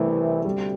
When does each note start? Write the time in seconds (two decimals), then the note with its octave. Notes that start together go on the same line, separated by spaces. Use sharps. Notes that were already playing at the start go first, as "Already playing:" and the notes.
Already playing: C2 C3 E3 A3
0.45 D2 C3 G3